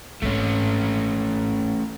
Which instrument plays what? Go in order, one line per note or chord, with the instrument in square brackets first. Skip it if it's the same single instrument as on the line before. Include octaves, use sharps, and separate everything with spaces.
[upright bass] G#1 G#2 [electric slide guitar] A3 C#4